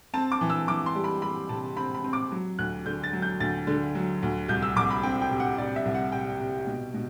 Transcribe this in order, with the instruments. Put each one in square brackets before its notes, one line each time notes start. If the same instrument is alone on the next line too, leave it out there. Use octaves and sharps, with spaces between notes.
[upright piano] C4 A5
D6
E3
E6
E3 D6
C6
G3
B5
G3 B5
C3 A5
C4 B5
B5
C4
D6
F#3
D2 F#6
D3 G6
A6
F#3
G6
D2 A6
D3
F#3
D2
C2 G6
E6
C2 D6
B5
C4 G5
G5
C3
F#5
C3 D5
E5
C2
F#5
C3 G5
C3
B2
B2